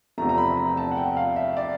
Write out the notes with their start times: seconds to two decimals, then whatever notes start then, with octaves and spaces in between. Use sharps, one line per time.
0.18 E2 C3 F3 A3 A#5
0.29 A#5
0.38 B5
0.57 A#5
0.77 A5
0.91 F#5
0.97 G5
1.17 F5
1.36 E5
1.57 D5